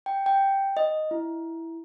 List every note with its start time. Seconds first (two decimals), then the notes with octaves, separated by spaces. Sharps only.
0.06 G5
0.26 G5
0.77 D#5
1.11 E4